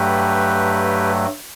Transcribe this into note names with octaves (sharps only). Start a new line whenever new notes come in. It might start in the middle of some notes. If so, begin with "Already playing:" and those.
Already playing: G2 F#3 A3 G4 B4